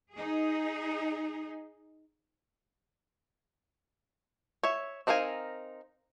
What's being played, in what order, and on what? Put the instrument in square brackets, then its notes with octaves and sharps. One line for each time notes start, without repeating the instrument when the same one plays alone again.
[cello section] D#4 G#4
[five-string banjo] C#5 E5
C4 D#4 A#4 F5 G#5